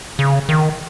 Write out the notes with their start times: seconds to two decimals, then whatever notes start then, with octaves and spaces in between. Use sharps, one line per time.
0.19 C#3
0.49 D#3